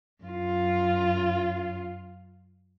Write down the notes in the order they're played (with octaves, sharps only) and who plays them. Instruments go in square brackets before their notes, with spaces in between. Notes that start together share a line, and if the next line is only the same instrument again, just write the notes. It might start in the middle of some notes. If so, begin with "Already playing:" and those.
[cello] F#2 F4